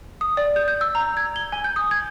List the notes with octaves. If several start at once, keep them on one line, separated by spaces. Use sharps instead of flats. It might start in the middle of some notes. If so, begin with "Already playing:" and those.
D#6
D5
G6
G6
E6
A#5
G#6
G7
G#5
G6
D#6
G#6